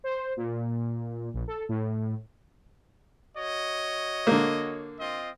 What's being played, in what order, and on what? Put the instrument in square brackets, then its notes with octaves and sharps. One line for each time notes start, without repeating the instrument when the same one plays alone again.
[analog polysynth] C5
A#2
A#1
A4
A2
[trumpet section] F#4 C#5 D#5
[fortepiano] D3 A#3
[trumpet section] C4 F4 D#5